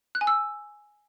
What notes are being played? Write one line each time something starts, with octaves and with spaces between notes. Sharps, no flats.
F#6
G#5
E6